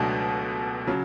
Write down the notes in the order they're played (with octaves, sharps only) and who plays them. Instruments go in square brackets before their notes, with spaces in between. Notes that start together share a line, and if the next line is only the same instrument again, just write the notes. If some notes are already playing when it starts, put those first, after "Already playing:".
Already playing: [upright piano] C#2 B2 F#3 A3 D4
C#3 F#3